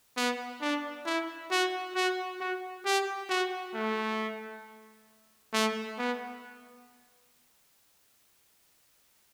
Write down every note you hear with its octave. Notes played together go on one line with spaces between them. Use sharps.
B3
D4
E4
F#4
F#4
F#4
G4
F#4
A3
A3
B3